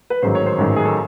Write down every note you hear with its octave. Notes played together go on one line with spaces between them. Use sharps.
B4
A1 G#2 D#3 F#3 C5
C#5
C5
A1 G#2 D#3 F#3
G#4
A4